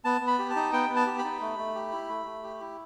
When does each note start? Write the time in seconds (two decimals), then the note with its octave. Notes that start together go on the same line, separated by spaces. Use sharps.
0.05 B3 A5
0.21 B3
0.27 B5
0.39 G4
0.50 A5
0.56 D#4
0.73 B3 G5
0.90 B3
0.96 A5
1.07 G4
1.18 B5
1.24 D#4
1.41 A3
1.58 A3
1.75 G4
1.92 E4
2.09 A3
2.26 A3
2.43 G4
2.60 E4